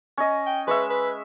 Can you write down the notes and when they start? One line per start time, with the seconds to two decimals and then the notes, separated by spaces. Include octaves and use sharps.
0.18 C#4 D#5
0.46 G5
0.67 G#3 B4 C#5 E5
0.90 B4